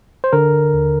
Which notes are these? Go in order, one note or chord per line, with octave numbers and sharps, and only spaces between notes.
C5
D3 A#4
D#2